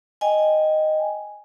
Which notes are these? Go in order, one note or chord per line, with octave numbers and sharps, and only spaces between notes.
D#5 G5 G#5